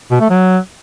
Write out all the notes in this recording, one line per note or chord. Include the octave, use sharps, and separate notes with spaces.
B2
A3
F#3